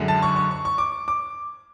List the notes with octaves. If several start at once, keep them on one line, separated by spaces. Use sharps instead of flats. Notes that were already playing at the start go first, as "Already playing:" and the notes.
Already playing: F#2 D3 G#3
A5
C#6
C#6
C#6
C#6
D6
D6